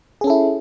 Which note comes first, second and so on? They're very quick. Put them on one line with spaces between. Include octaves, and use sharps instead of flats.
G#4 C#4 A4 E4